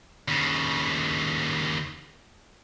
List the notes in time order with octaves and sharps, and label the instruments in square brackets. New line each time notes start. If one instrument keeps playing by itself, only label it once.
[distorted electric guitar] D#2 C#3